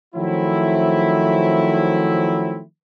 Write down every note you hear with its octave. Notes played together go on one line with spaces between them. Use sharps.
D#3 F3 F#3 A3 C4 E4